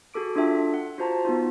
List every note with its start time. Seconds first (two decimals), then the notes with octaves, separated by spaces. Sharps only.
0.14 F#4 G#4 A4 D6 D7
0.36 D4 F4 A4 E5 G5
0.74 F#5
0.98 F4 F#4 C5 A5 A#5
1.25 B3 D#4 F4